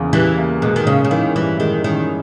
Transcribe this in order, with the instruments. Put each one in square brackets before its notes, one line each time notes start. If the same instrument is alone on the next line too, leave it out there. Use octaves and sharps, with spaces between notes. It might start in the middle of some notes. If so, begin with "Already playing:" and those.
Already playing: [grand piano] E2 C#3 A#3
[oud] E3 [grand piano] G3
[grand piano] A#3
[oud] B2 [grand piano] G#3
[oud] D#3
[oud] C#3 [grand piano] C#4
[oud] C#3
[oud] D#3 [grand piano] E3
[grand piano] G2 [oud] E3
[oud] D#3 [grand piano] G#3
[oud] D#3 [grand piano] C#4